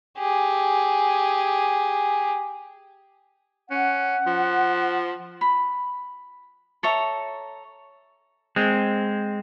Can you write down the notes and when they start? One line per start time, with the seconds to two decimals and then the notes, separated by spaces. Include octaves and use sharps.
0.18 G4 G#4
3.71 C#4 F#5
4.27 F3
5.41 B5
6.83 A4 C#5 E5 A#5
8.56 G#3 C4